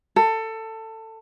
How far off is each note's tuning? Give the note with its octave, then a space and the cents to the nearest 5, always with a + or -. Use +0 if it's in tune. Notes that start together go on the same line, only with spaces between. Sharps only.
A4 +20